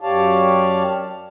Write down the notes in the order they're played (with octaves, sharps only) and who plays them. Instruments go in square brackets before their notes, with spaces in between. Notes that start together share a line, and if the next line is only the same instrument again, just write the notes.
[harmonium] F#2 G4 C#5 D5 F5 A5